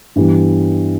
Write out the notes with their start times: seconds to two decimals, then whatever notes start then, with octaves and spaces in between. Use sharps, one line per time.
0.16 G2 E3 G3 B3